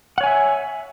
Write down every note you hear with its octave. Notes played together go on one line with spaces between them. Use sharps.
C#5 E5 F#5 G#5